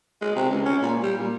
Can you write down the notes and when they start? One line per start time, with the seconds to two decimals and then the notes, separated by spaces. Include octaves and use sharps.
0.21 G#3
0.36 C3
0.50 C#2
0.65 C#4
0.82 A#2
1.03 G3
1.18 A#2